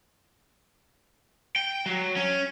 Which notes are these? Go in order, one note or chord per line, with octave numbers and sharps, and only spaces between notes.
G5
F#3
C#4